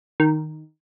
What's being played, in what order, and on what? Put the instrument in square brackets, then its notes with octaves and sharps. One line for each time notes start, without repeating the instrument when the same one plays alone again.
[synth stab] D#3